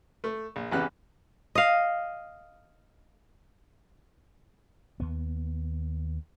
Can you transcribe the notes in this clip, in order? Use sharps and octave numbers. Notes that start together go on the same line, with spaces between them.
A3
A#1
G#1 C#3 E3 B3 G4 F#6
D#5 F5
D#2 B3